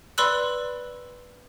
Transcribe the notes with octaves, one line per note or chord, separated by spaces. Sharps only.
B4 D5 B5 C6 E6 F#6